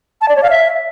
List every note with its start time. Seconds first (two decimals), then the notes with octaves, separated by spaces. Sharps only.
0.21 A5
0.29 D5
0.36 C#5
0.43 F5
0.50 E5